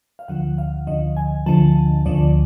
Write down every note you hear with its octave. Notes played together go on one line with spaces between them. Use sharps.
F5
D2 D3 F3 F#5
F5
D2 D3 F3 D#5
G#5
D2 D3 F3 A5
D2 D3 F3 D5